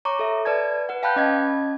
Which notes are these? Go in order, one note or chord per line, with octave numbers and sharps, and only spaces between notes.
C#5 A#5 C#6 D6
A4 E5
B4 D5 A5 G#6
B4 F#5
F5 G5 A5 B5 F#6 G6
C#4 D#5 A5 G#6